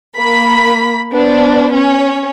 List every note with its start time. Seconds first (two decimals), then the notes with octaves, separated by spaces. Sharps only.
0.15 A#3 B5 B6
1.12 B3 D4 C5
1.72 C#4 C#5